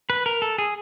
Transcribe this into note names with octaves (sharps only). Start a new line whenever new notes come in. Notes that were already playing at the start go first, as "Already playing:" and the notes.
B4
A#4
A4
G#4